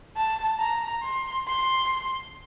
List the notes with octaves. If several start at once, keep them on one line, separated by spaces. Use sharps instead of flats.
A5
A#5
C6
C6